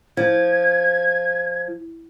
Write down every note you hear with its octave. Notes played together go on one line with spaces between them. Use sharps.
F3 G#6